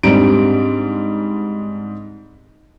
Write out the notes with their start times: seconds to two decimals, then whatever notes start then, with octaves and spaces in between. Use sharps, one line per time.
0.03 G#2 G3 C4 D4 A#5 D7